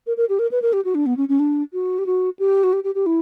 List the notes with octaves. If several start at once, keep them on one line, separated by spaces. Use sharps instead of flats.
A#4
A#4
G4
A#4
B4
A#4
G4
F#4
D4
B3
C#4
C#4
D4
F#4
G4
F#4
G4
F#4
G4
G4
G4
E4